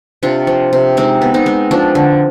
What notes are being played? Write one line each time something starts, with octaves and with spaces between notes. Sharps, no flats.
C3 D4 F4
F3
C3
G#3 C4 D#4
B3
C4 D#4
G#3
F3 D4
D3